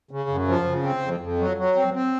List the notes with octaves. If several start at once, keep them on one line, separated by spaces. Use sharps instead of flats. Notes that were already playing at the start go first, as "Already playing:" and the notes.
C#3
F#2
F3
C#3
C4
F2
F2
F#3
F#3
C4
C4